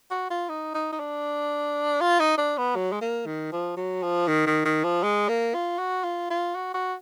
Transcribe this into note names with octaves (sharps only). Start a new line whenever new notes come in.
F#4
F4
D#4
D#4
D#4
D4
F4
D#4
D4
B3
F#3
G#3
A#3
D#3
F3
F#3
F3
D#3
D#3
D#3
F3
G#3
A#3
F4
F#4
F4
F4
F#4
F#4